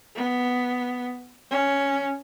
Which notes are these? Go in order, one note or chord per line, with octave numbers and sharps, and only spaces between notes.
B3
C#4